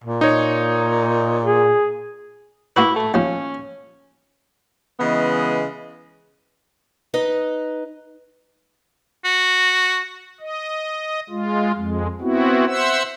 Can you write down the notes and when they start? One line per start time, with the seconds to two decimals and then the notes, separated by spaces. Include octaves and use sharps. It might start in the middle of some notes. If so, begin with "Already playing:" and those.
0.04 A#2
0.21 D#4 C#5
1.44 G#4
2.76 A#3 E4 F#4 B4
2.96 A3
3.14 D#2 F3 C#4
5.00 C#3 E3 G#3 B3 D#5
7.14 D#4 B4 D#5
9.25 F#4
10.40 D#5
11.30 G#3 F4
11.76 F2 G#3
12.21 B3 C4 E4 F#4
12.67 C5 E5 F#5 E6